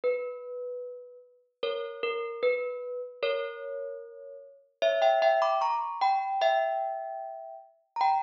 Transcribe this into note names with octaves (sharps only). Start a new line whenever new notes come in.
B4
A#4 C#5
A#4
B4
A#4 C#5
C#5 E5
E5 G5
E5 G5
B5 D6
A#5 C#6
G5 B5
E5 G5
A#5
G5 B5